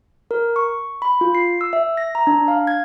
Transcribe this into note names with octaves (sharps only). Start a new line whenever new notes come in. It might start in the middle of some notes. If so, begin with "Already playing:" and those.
A#4
C#6
B5
F4
C7
E6
E5
A#6
A#5
D4
F5
G#6